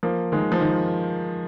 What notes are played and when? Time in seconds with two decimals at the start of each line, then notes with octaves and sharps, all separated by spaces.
0.03 F3 A#3
0.32 D#3 G#3
0.52 F3
0.61 D#3